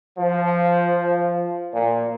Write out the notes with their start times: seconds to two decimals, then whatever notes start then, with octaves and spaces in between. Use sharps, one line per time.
0.18 F3
1.74 A#2